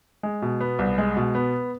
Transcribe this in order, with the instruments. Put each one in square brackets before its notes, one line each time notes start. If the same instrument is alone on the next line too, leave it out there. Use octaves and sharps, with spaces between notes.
[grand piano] G#3
B2
B3
C2
G#3
B2
B3